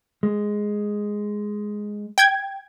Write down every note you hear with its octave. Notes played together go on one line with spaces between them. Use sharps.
G#3
G5 G#6